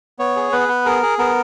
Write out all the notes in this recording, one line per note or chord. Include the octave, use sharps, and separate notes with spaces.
B3 C#5
G#4
B3 B4
B3
G#4 A#4
G#4
B3 A#4